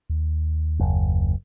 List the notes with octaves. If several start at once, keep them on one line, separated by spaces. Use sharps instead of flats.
D#2
F#1